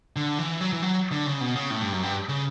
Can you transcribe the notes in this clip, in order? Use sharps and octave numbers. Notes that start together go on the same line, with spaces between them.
D3
E3
F#3
E3
F#3
D3
C#3
B2
C#3
A2
G2
F#2
G2
C#3